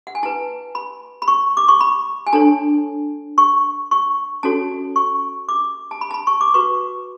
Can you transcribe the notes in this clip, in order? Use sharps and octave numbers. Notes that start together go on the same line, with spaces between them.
F#5
G#5
E4 B4 A5
B5
B5
C#6
D6
C#6
B5
G#5
D4 A4 C#5 A5
C#6
C#6
C#4 F#4 A4 C#5 A5
C#6
D6
A5
B5
A5
B5
C#6
D6
F#4 B4 C#6